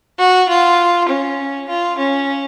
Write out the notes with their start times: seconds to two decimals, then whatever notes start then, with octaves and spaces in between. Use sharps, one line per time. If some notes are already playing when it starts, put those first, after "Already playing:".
0.19 F#4
0.49 F4
1.09 C#4
1.69 F4
1.98 C#4